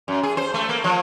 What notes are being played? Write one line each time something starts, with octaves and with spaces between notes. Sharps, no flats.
F#2
G#4
C5
A3
A#3
F3